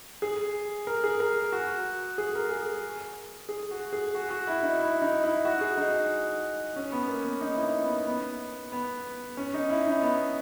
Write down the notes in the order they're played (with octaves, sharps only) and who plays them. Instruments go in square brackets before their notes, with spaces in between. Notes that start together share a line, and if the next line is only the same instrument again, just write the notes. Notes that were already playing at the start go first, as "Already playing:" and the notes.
[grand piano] G#4
A#4
G#4
A#4
F#4
G#4
A#4
G#4
G#4
F#4
G#4
F#4
F#4
E4
D#4
E4
D#4
E4
F#4
G#4
D#4
C#4
B3
A#3
B3
D#4
E4
D#4
B3
B3
B3
C#4
D#4
E4
D#4
B3